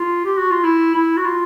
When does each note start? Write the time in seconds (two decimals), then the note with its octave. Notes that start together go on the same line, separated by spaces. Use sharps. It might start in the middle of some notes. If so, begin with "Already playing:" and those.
Already playing: F4
0.25 G4
0.38 F#4
0.51 F4
0.64 E4
0.94 E4
1.17 F#4
1.25 F4